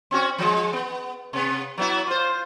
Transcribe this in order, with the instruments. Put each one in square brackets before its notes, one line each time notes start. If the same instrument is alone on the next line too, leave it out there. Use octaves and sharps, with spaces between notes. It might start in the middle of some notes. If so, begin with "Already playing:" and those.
[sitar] C4 C#4 F#4
F3 F#3 G#3
B3
C3 B3
F#3 B3 E4
F4 C5